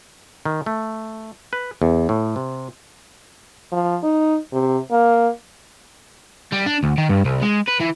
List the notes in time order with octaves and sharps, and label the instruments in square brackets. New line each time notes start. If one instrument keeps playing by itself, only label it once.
[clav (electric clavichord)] D#3
A3
B4
E2
A2
C3
[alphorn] F3
D#4
C3
A#3
[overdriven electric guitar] G3
D4
D2
D#3
G2
C2
G#3
B4
E3